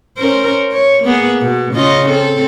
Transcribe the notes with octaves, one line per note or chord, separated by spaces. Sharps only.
C#4 A#4 C5
C#5
A#3 B3 G#4
B2
C#3 F4 D#5
C4 A4